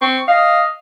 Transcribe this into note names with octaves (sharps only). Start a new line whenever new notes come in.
C4 C#6
D#5 F5